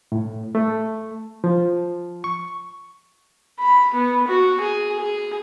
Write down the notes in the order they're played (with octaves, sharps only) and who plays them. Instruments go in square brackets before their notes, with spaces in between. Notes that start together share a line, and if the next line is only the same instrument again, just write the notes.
[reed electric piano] A2
A3
F3
C#6
[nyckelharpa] B5
B3
F#4
G#4
G#4